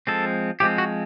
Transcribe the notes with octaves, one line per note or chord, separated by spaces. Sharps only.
F3 G#3 C4 A4
F3 G#3 C4 G4
F#4